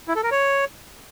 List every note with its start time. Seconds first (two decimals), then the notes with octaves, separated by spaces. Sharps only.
0.08 E4
0.16 A4
0.23 A#4
0.31 C#5